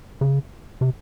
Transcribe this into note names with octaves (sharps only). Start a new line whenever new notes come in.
C#3
C3